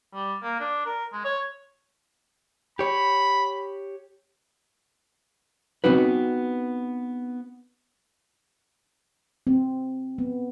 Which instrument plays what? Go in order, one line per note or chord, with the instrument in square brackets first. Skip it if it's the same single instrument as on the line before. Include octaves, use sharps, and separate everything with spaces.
[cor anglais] G3
A#3
D4
A#4
G#3
C#5
[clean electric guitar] G4 C#5 [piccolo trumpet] B5
[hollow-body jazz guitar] B3 C4 D#4 F#4 B4
[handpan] C4
B3